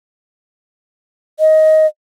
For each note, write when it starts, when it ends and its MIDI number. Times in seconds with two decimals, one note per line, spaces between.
1.40 1.86 75